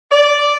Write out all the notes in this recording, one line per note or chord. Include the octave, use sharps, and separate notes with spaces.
D5